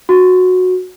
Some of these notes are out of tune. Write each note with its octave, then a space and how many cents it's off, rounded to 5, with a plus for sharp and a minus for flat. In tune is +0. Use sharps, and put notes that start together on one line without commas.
F#4 -10